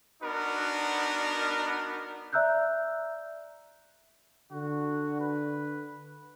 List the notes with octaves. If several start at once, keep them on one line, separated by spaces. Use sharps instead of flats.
B3 D4 D#4 F#4 A#4
D5 E5 A#5 E6 F#6 G6
D3 F#4
B4